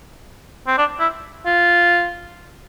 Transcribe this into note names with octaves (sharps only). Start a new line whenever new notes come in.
C4
D4
E4
F4